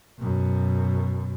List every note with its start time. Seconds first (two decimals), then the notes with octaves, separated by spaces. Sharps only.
0.19 F#2 B2